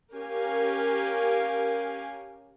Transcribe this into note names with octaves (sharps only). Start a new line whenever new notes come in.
C#4 G4 A#4 F5 G#5